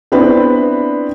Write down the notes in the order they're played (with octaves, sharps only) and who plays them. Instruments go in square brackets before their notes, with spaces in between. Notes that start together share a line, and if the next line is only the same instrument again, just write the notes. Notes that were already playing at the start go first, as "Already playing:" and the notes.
[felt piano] B3 C4 D4 E4 B4